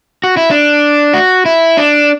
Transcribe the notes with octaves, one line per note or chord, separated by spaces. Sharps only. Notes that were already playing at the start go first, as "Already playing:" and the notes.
F#4
E4
D4
F#4
E4
D4